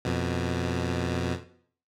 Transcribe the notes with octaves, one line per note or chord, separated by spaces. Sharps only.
F2 B2